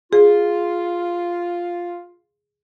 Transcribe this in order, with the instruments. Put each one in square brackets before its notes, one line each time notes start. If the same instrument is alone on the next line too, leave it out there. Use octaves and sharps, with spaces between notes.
[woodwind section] F4 [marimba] G#4